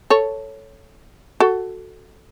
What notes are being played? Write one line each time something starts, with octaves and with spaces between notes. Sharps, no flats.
A4 C#5
F#4 A4